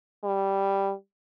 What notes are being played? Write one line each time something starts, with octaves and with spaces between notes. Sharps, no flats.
G3